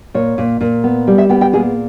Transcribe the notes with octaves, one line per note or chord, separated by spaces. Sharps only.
A#2 C#5
A#2
A#2
B3
G3
E5
B3 G5
G5
A#2 G#4